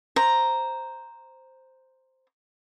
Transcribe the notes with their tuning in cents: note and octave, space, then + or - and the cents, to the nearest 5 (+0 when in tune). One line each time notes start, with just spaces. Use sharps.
C5 +0 A#5 +0